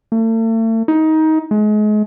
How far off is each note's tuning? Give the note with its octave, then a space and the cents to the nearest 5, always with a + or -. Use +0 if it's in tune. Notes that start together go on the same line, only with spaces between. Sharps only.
A3 +40
D#4 +20
G#3 +35